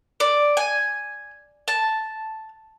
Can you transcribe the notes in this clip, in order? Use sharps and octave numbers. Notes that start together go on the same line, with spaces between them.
D5
G#5
A5